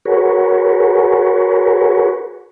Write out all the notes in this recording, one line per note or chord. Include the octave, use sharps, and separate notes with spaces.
F#4 G#4 A#4 B4 C#5